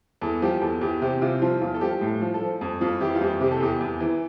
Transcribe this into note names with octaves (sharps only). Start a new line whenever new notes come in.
E2 A4
F3 G4
E2 A4
E2 G4
C3 G4
C3 F4
F3 F4
E2 F4
A4
F3 G4
A2
F3
A4
F3
F2
F2 F4
E3 G4
F4
F2 G4
C3 G4
A4
E2 G4
E2
E3